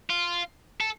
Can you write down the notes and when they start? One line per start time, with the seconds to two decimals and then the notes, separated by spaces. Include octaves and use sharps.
0.10 F4
0.80 A4